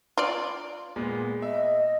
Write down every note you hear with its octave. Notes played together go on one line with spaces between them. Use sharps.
F4 D5
A#2 G#3 B3
D#5 E5